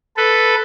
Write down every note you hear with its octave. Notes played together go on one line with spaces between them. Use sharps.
A4 B4